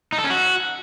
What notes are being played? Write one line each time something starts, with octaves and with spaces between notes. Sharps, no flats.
D#4
A4
C#4
F#4